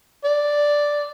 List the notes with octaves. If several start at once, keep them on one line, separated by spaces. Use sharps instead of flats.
D5